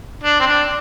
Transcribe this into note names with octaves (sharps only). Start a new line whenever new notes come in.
D4
C4
D4